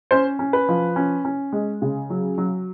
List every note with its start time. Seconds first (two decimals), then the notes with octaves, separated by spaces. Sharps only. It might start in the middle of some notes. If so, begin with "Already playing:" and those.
0.11 C#4 C5
0.39 C#4
0.53 B4
0.69 F3
0.96 C#4
1.25 C#4
1.53 G#3
1.82 C#3
2.10 F#3
2.38 F#3